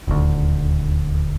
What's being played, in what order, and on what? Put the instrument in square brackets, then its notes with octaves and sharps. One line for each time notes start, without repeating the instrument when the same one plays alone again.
[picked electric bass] D#1 D2